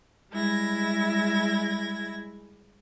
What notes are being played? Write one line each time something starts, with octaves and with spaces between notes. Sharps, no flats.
G3 G#3 E4 G#6 A#6